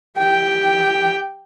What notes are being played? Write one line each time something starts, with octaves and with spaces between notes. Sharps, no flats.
G4 G5